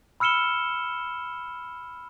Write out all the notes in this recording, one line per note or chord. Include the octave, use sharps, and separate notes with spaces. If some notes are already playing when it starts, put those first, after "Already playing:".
B5 E6 F6 C#7 E7 G7